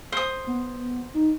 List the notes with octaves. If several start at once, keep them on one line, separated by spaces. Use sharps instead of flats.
C5 D#6
B3
D#4